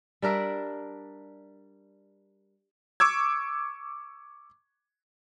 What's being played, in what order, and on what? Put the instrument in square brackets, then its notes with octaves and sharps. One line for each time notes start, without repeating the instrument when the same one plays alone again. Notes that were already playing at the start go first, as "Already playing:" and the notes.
[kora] G3 D4 A#4 E5
[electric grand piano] C#6 D6 E6 G#6